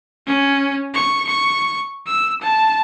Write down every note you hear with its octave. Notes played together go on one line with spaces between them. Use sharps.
C#4
C#6
C#6
E6
A5